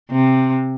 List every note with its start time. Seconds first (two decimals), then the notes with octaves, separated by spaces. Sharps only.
0.10 C3